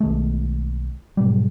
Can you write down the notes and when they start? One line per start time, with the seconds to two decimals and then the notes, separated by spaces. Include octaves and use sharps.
0.01 B1 D#3 G#3 A3
1.17 G#2 B2 F#3 G3